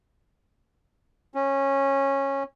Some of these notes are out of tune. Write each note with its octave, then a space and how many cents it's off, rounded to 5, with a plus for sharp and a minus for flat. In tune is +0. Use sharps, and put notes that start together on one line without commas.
C#4 -15